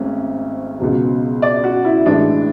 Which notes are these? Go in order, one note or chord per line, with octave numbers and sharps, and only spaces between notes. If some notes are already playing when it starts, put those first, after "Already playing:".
Already playing: G#1 G#2 A3 C#4
C#2 B2 F#3
D5
F#4
E4
A1 A2 E3 G#3 D4